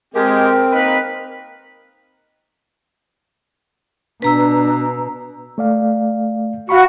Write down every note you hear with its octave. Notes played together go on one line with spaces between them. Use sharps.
G#3 C4 G4 A#4
A#3 D#4 B4
B2 D4 B4 A#5 E6
A3 D5 F5
F#4 F5 B5 C#6